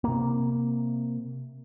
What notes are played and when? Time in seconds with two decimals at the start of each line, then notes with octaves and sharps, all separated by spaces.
0.04 C3 A#3